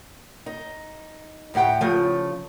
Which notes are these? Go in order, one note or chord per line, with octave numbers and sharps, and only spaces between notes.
D#4
D2 A2 G4 F#5 G5
C#3 F3 A3